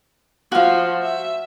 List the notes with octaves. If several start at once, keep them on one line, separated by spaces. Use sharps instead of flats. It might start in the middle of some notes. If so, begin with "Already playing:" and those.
F3 F#4 F5
E5